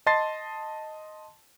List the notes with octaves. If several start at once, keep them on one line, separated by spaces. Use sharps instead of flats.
D#5 A5 C6 A6 C7